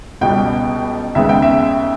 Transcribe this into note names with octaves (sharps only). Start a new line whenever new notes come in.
C#2 B2 G3 G5
D#2 C#3 G#3 B3 E5
G5
E5